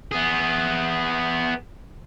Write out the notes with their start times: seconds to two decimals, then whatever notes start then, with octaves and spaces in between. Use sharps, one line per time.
0.12 B3 G#4